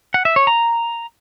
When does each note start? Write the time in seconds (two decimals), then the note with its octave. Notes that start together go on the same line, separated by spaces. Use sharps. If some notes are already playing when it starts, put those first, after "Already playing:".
0.14 F#5
0.25 E5
0.36 C#5
0.47 A#5